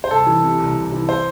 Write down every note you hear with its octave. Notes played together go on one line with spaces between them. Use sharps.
C5
C2 A4
E3
C3
C2
C2
E3
C5